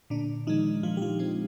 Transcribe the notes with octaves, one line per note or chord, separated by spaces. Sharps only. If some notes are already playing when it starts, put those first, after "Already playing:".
A#2 D3 D4
D#3 F3 G#3 D#4
A#2 F3 F4
G4
F3 F4
F3 G#3 C4